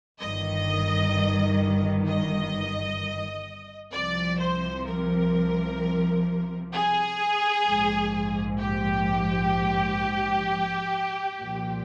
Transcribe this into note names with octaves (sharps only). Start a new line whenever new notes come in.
G1 G2 D#3 D#5
D#5
C2 C3 F3 D5
C5
A#4
G#4
A#1 G#2 F3
G4
C2 A#2 F3